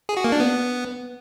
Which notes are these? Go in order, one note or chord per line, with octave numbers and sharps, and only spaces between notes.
G#4
F#4
A#3
D4
B3